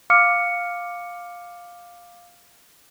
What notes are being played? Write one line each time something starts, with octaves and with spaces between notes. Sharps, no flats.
F5 D6 F6 C#7